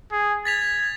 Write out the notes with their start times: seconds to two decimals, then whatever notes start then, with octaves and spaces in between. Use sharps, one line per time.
0.12 G#4
0.45 G#6 A6 B6 F7